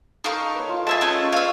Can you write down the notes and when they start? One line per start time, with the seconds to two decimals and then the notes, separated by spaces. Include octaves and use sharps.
0.24 D#4 A4 A#4 F5 C#6
0.55 B4 C#5
0.69 F4
0.87 G#3 G#4 E5 F5 A5
1.01 A3 C#4 C#5
1.32 D5 F5 C#6 E6